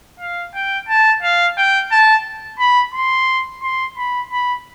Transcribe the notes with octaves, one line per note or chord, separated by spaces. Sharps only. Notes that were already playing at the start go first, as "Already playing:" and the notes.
F5
G5
A5
F5
G5
A5
B5
C6
C6
B5
B5